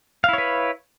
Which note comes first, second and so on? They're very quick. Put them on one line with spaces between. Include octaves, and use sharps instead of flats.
F5 E4 C#5 B4